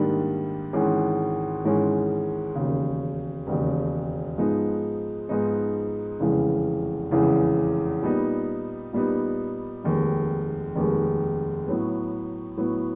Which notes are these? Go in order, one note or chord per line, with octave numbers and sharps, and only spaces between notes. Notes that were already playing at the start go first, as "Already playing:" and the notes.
Already playing: G#2 D#3 G3 A#3 D4
G#1 G#2 E3 G#3 C#4
G#1 G#2 E3 G#3 C#4
E1 D#2 C#3
E1 D#2 C#3
G#2 F3 G#3 B3 D#4
G#2 F3 G#3 B3 D#4
F1 E2 C#3 E3 G#3
F1 E2 C#3 E3 G#3
A#2 G3 B3 D#4
A#2 G3 B3 D#4
F1 D#2 D#3 G#3
F1 D#2 D#3 G#3
A2 F#3 B3
A2 F#3 B3